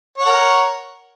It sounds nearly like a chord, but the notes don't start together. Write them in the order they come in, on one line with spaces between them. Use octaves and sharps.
C#5 F#5 A#4